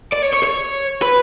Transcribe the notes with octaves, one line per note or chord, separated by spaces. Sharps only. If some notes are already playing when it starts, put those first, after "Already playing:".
D5
C#5
C#5
C#5
B4